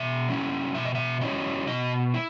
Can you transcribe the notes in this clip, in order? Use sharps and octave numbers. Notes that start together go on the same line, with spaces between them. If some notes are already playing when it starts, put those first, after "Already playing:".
Already playing: B2 E5
F#3 C#4 E4
B2 E5
D#5
E5
F#3 C#4 E4 D#5
B2 D#5
E4